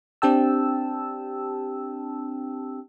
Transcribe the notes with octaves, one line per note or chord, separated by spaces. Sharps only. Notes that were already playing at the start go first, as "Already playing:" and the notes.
C4 D4 G4 G5 A5 E6